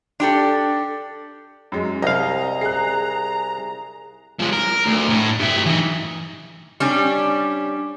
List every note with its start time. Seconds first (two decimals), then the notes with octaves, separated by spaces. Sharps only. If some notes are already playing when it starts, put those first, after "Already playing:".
0.20 D4 G4 A4
1.72 F#2 F#3 G#3
2.02 C2 D#5 F5 A#5
2.61 G#4 F#6 C7
4.39 F3 G#3
4.52 A#4
4.85 D2
5.09 A2
5.40 G2 E5
5.66 E3 D#4
6.80 G3 C#4 D4